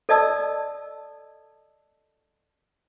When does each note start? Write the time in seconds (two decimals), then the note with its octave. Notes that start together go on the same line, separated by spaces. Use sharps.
0.09 A4 D5 D#5 A5 E6